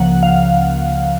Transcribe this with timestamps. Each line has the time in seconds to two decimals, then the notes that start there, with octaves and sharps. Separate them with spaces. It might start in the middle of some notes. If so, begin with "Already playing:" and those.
Already playing: C#2 C#3 F3 A#3 F#5
0.23 F5